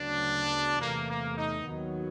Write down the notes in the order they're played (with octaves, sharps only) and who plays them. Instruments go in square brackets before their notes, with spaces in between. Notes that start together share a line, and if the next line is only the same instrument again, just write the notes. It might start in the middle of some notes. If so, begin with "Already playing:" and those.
Already playing: [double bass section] D2 C#3 F#3 B3 [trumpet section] D4
[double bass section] E2 C3 E3 A3 [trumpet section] A#3
[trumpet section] A#3
D#4
[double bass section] D#2 D#3 F#3 B3